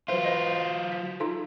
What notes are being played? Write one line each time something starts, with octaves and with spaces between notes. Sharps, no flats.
F#3 F4 B4 C5 E5
B4 C5 D#5
B6
D#4 F4 A4